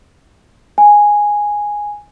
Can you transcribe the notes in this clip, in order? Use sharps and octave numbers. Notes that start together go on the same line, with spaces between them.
G#5